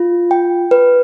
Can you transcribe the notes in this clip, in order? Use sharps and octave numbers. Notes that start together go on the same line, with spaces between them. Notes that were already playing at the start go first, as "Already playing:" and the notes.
Already playing: F4
G5
B4